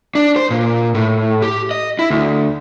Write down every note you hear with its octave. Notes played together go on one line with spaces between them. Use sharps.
D4
C5
A#2
A2
G4
D#5
E4
D2